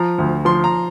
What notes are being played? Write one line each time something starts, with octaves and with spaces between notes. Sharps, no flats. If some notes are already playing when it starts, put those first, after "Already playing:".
Already playing: F3 A#5
D2
F3 C6
A#5